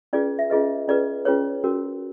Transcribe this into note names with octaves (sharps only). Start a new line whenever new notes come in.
C#4 F4 G#4 B4 D5
E5
C#4 F4 G#4 B4 D#5
C#4 F4 G#4 B4 D5
C#4 F4 G#4 B4 C#5
C#4 F#4 A#4